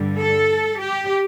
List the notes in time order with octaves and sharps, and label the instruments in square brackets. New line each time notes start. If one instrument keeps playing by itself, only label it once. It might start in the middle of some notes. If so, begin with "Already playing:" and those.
Already playing: [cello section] G2 D3 G3
A4
G4